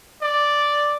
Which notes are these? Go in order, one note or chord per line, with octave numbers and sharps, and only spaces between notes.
D5